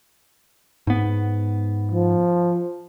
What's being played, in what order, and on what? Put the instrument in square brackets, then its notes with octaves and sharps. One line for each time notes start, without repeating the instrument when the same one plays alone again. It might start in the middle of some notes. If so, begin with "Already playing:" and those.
[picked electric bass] G#2 B3
[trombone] F3